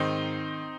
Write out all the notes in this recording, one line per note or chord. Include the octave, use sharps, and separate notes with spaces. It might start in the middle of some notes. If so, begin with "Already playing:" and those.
Already playing: G#2 D#3 C4 D#4